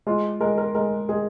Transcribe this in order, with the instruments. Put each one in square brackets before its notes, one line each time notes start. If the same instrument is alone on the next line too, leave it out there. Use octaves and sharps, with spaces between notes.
[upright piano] G#3 [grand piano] F4
[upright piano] G#3 [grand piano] A#4
[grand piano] A#4
[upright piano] G#3 [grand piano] A#4
[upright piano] G#3 [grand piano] G#4